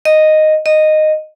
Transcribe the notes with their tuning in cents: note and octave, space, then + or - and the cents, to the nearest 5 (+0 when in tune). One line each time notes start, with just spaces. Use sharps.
D#5 -5
D#5 -10